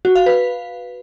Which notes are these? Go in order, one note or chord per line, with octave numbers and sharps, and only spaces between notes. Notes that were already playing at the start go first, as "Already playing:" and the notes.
F#4
F5
B4